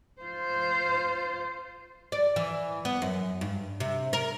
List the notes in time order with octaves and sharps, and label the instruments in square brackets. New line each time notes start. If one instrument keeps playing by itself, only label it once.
[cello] F4 C5
[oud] D5
E3
B3
F#2
G2
C3
A#4